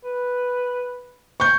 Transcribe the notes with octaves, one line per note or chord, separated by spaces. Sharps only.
B4
C#6 G6